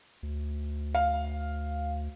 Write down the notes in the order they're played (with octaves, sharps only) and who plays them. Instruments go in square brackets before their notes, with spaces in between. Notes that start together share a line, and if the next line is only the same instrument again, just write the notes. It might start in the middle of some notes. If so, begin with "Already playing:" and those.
[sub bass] D2
[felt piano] F5